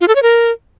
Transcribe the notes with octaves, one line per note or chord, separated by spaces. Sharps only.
F4
A4
C#5
A#4